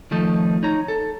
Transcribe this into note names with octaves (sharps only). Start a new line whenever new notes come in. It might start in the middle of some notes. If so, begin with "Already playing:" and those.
D#3 F3 A3 D#4
D#4 C#5 A#5
A4